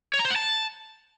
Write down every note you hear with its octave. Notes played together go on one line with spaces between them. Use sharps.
C#5
A#5
C5
F#5
A5